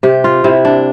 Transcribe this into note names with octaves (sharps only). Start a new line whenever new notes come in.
C3 G4
F4
C3 E4
D4